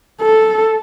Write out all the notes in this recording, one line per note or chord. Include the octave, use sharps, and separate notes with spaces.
A4